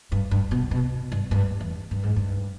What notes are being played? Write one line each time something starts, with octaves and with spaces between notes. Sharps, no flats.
G2
G2
B2
B2
G2
G2
E2
G2
G#2
G2